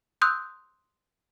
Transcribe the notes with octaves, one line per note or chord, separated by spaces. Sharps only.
C6 D#6 E6 F#6 G6